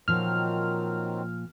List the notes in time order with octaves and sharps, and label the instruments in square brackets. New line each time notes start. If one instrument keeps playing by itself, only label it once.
[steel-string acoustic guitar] A#2 F3 [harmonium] D#3 F#3 C4 [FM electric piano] F6